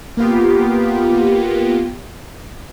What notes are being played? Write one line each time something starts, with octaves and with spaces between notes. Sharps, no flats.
A#3 B3 F4 G4